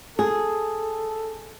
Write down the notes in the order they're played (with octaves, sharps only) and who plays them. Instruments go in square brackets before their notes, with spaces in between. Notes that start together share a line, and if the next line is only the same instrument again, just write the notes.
[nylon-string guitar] G#4 [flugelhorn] A4